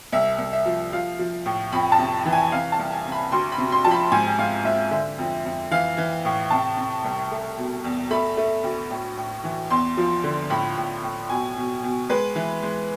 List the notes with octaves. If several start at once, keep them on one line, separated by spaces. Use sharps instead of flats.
C2 E5
C2
E5
F3
F3 F5
F3
A2
F2 B5
A5
C3
E3
G#5
C3 F5
A5
C2
G#5
C3
B5
D2 C6
B5
C3
C6
F3 A5
B5
G#2 G#5
G#5
G#2 F5
G#2 E5
D3 E5
F2
F2
E3 F5
E3
A2
C3 A5
C3
C2
A3
B2
E2
A3 B5
A3
D2
A2
A2
E3
E2 C6
F3
D3
A2 B5
A2
A2
B2 G#5
B2
B2
G#3 B4
E3
G#3